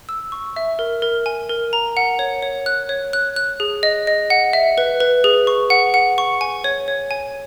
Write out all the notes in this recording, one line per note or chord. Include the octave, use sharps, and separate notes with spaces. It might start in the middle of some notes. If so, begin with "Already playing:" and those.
E6
C#6
E5
A#4
A#4
G#5
A#4
A#5
F#5
C#5
C#5
F#6
C#5
F#6
F#6
G#4
D#5
D#5
F#5
E5
B4
B4
G#4
C#6
F#5
F#5
C#6
G#5
C#5
C#5
G#5